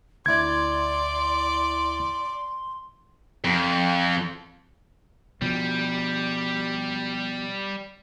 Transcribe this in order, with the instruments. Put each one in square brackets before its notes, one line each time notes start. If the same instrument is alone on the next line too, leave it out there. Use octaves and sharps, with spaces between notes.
[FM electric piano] D2 E4 A6 [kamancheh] D5 [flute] C6 [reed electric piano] G#6
[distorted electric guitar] F2
[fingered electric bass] B2 F3 [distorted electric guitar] G3